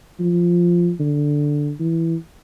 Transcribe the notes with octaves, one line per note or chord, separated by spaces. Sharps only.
F3
D3
E3